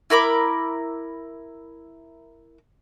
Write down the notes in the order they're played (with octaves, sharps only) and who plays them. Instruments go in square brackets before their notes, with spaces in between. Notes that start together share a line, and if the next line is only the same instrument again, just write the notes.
[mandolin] E4 A#4 B5 D6